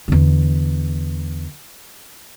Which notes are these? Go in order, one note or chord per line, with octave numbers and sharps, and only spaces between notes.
E2 D3